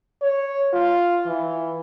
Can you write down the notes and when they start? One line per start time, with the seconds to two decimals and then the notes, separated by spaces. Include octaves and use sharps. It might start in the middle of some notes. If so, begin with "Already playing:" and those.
0.22 C#5
0.73 F4
1.26 E3